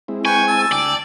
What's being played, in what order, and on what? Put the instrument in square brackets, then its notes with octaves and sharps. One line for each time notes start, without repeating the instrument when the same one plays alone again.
[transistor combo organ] G#3 C4 E4
[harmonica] B4 G5 C#6 [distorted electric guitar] G#5
[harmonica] A5 E6
[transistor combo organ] D2 G5 [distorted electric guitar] D5